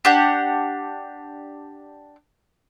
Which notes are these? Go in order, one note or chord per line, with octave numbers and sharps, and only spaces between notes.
D4 G4 F#5